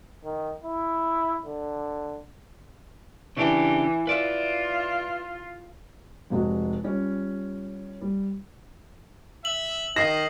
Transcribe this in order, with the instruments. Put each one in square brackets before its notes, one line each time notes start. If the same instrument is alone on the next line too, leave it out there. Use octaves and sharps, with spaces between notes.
[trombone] D#3
E4
D3
[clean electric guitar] C#3 D4 G4 [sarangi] E3
[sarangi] F4 [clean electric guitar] B4 D5 E5
[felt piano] F1 C3 G#3 F#4
G3 C#4 F4
G3
[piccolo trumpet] E5 [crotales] F#7
[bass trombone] D#3 [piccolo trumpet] D#5 [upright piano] A#6 [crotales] C7 E7